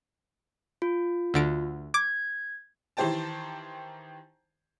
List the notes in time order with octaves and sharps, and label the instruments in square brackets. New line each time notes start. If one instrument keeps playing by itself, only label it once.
[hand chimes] F4
[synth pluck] D2 D3 D7
[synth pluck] D6 [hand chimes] G#6
[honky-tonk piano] D#3 E3 G4 C5 G5 A5